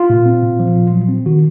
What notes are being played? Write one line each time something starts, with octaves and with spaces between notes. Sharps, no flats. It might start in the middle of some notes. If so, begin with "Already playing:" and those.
Already playing: F4
A#2
C4
A#2
F3
A#2
F#3
C4
D#3 F#4